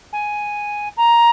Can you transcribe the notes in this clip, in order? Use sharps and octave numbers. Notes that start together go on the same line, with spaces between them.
G#5
A#5